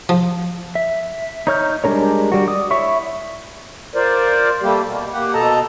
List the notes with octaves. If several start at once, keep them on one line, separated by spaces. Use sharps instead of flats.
F3
E5
D#4 C#5 F6 G6
G3 G#3 D4 A#4 C#5
G3 F#4
D5 D#6
E4 C#5 E5 C#6
F4 A#4 C5 D5
G3 A3 A#3 G4
B2 A#3
A#3 G4 F#5
B2 A4 D#5 A5 A#5